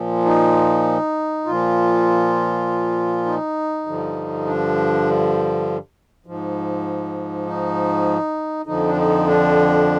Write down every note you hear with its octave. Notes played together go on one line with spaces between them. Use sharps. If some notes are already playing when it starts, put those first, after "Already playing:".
Already playing: A#2 F3
D#4
A#2 F3 F4
D#4
G2 D3 F3
D4
G#2 F3
D#4
F2 D3 F3 D#4
D4
D#4
D4